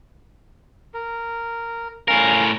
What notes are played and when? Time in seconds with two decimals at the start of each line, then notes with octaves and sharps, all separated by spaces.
0.94 A#4
2.08 A2 C#4 A#4 F5